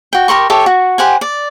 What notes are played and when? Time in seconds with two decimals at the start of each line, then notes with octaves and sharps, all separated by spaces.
0.13 F#4 G5
0.28 G4 A#4 C6 C#6
0.50 G4 A4 C#5 E5
0.66 F#4
0.98 G4 C5 F#5 G#5
1.21 D5